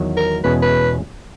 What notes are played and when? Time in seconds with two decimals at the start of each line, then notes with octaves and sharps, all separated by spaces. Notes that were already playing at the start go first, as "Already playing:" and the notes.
Already playing: E2 D#3 F#3
0.17 A#4
0.44 E2 B2 G#3 C#4 B4
0.62 B4